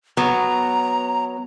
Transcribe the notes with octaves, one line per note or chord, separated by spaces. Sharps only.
F#3 B3 A#5